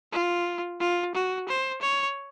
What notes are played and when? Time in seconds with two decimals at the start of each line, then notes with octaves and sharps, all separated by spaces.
0.12 F4
0.80 F4
1.15 F#4
1.48 C5
1.81 C#5